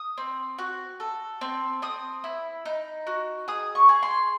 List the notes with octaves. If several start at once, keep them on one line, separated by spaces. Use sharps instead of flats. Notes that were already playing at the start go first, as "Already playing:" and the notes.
Already playing: D#6
C4
F#4
A4
C4
C4 D#6
E4
D#4
F#4
G#4 D#6
C#6
G#4
C6